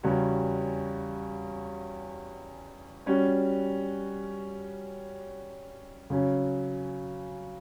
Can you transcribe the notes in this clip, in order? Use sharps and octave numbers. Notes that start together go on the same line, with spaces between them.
E2 C#3 G3 C#4 F#4
G3 C#4 F#4
C#3 F#3 C#4